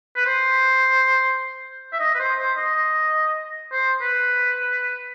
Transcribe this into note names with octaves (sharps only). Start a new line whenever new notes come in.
B4
C5
E5
D#5
B4
C5
C5
D#5
C5
B4